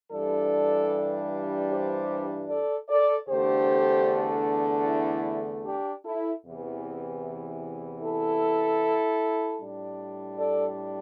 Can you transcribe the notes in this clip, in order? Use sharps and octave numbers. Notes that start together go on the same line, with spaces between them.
G2 E3 G3 D4 A4 D5
G4 C5
A4 D5
A4 D5
E2 D3 A3 D4 G4 C5
E4
D4 G4
E4 A4
E2 C3 E3
E4 A4
A2 G3 D4
A4 D5